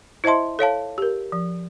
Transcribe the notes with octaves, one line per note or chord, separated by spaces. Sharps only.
E4 C5 D#5 E5 A5 C6
A4 C#5 F5 A5
G4 A#4
F3